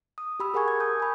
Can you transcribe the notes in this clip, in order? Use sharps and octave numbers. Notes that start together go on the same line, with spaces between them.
D#6
G4 B5 E6
G#4 A#4 F#5 G#5 C#6 G#6
G#6
A5 D#6 G6
G#5 B5